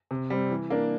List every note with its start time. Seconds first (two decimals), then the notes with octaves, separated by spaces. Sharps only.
0.11 C3
0.30 G3 C4
0.50 E3
0.70 A#3 D4